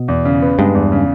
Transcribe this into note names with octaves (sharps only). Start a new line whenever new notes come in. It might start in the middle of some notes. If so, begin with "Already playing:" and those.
Already playing: B2
E2
C#3
B3
G2 G#3
E2
C#3